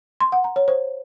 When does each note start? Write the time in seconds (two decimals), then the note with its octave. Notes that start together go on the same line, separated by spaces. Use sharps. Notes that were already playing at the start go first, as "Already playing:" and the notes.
0.21 C6
0.32 F#5
0.44 A#5
0.56 C#5
0.68 C5